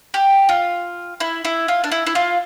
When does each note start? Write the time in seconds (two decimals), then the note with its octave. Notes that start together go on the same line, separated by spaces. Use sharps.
0.14 G4
0.49 F4
1.20 E4
1.45 E4
1.68 F4
1.84 D4
1.92 E4
2.07 E4
2.15 F4